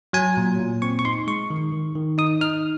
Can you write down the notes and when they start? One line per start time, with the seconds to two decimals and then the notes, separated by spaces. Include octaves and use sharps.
0.13 F#3 G#5
0.37 A#2
0.60 A#2
0.82 C4 C#6
0.99 C#6
1.05 D#4 C6
1.27 G#3 C#6
1.50 D#3
1.72 D#3
1.96 D#3
2.18 D#4 D#6
2.41 D#4 F6